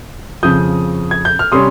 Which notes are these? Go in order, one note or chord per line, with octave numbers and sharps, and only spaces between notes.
F2 C#3 F3 D#6 G6
G#6
G6
F6
C3 G3 C#4 C6 D#6